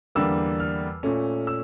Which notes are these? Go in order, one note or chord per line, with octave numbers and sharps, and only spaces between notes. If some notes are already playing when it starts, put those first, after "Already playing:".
E2 D3 G3 A#3 E6
F6
A#2 A3 C#4
E6